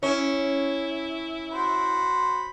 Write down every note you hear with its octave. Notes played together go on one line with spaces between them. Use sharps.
C#4 E4
F#4 C5 B5